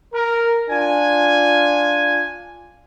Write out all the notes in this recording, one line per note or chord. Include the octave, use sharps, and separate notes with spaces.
A#4
D4 F4 G#5